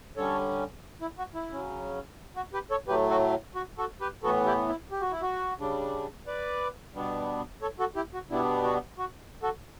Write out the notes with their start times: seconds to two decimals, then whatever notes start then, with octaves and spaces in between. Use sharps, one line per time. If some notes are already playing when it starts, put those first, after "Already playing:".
0.17 D3 G3 C#4 A4 C#5
1.01 E4
1.18 F#4
1.35 E4
1.53 C#3 F#3 C#4
2.36 F#4
2.53 G4 B4
2.70 A4 C#5
2.88 A2 F#3 A3 G4 B4
3.10 F#4 A4
3.55 F#4
3.78 F#4 A4
4.01 G4 B4
4.23 A2 E3 B3 F#4 A4
4.46 E4 G4
4.69 E4
4.91 G4
5.01 F#4
5.11 E4
5.22 F#4
5.59 C#3 G3 D4
6.27 B4 D5
6.95 B2 G3 B3 D4
7.62 A4 C#5
7.79 F#4 A4
7.96 E4 G4
8.14 F#4
8.30 B2 G3 B3 D4 E4
8.64 F#4
8.98 F#4
9.43 F#4 A4